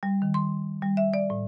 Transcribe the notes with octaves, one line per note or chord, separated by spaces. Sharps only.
G3
D#3
C6
G3
E5
D5
A2